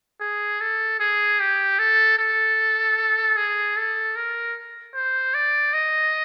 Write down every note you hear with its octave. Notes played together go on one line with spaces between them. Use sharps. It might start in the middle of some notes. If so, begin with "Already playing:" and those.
G#4
A4
G#4
G4
A4
A4
G#4
A4
A#4
C5
D5
D#5